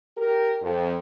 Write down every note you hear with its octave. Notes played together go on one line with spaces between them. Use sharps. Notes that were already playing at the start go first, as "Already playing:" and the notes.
G4 A#4
F2